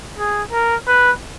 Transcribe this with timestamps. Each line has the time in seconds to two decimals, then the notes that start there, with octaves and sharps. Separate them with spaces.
0.18 G#4
0.52 A#4
0.87 B4